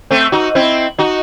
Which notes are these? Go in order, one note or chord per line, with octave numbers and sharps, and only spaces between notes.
A3 C4
D#4 F#4
C4 E4
D#4 F#4